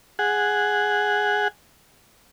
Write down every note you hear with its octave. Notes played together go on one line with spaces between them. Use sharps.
G#4 F#5